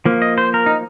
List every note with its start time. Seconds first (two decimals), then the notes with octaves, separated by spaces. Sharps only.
0.06 F3 A#3
0.22 D#5
0.38 C5
0.54 A#4
0.66 D#4